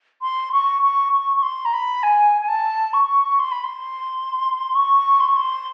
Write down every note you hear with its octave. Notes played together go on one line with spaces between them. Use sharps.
C6
C#6
C#6
C#6
C#6
C6
A#5
B5
G#5
G#5
A5
C#6
C6
B5
C6
C#6
C6
C#6
C6